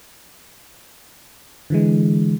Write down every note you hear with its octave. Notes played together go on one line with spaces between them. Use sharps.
D3 E3 G#3